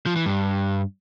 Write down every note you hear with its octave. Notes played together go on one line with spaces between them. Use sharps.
F3
E3
G2